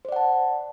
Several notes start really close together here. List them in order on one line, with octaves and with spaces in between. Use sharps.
C5 D5 F#5 A5